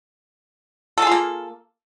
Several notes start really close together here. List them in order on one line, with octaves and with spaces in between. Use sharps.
A4 G#4 F4 A#3